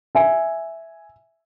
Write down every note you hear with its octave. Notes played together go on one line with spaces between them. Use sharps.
E5 G#5